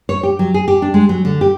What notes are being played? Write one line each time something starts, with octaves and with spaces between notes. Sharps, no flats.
C#5
G4
F#3
G#4
G4
D4
G#3
F#3
D3
G4